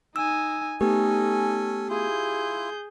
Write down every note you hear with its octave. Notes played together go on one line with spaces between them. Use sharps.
D#4 G#5 E6
A3 B3 C#4 D#4 G4 A4 G#5
E4 F4 G#4 G6